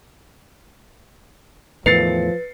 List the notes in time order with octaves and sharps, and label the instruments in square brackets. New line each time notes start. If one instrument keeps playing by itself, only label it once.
[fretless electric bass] E2 A2 D#3 [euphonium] F3 [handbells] B4 [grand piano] A6 C7 C#7